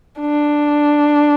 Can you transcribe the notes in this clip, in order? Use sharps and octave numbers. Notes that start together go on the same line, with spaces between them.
D4